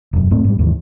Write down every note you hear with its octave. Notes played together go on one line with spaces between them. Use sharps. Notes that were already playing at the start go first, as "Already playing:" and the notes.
E1 F#2
D#1 G#2 A3 C4
G#2 G3
D#2 G#2 D#3 E3